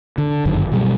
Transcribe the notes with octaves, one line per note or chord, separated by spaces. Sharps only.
D3
G1 F#2 D3 D#3
B2 F#3 G3